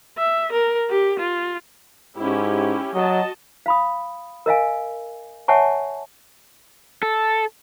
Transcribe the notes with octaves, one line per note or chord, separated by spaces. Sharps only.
E5
A#4
G4
F4
G#2 C#4 E4 G4
F#3 F#4 D#5 A5
F5 B5 D#6
A#4 D#5 F5 G#5
C#5 E5 F#5 G#5 A5 C#6
A4